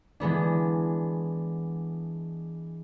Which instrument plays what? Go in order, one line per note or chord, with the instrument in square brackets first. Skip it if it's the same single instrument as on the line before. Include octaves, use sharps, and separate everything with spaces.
[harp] E3 G#3 B3 D4